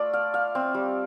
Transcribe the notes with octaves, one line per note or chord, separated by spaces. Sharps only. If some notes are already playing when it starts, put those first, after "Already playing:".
Already playing: A3 F4 D5
F5
F5
C4
G3